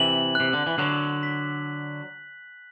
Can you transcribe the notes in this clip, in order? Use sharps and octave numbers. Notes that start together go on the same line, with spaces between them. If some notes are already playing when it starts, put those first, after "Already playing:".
Already playing: C3 E3 F#7
C3 F#6
D3
E3
D3 F#3 F#6
B6